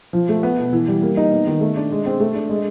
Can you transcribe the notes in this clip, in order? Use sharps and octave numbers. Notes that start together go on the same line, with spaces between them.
F3
A3
B3
B2
E3
G3
A#3
D#4
B3
D#3
A3
D4
G#3
C4
A3
D4
G#3